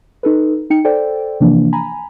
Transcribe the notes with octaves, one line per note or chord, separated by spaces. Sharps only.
D#4 A4 B4
D#4 G5 C#7
A4 C5 D5 G5
C3 E3 F3 A#3 D4
G#5 A#5 B5